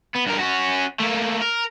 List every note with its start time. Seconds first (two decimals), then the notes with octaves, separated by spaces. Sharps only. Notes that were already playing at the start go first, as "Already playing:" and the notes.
0.15 B3
0.26 G2 A#4
0.39 C#4 F#4
1.00 A3 A#3
1.42 A#4